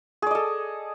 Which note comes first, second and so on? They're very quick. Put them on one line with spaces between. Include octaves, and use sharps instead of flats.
G#4 D5 D#5 A4